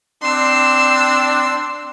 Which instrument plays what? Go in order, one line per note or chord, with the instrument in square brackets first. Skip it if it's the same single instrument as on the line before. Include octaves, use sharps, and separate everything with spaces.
[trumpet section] C4 D4 [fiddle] C6 E6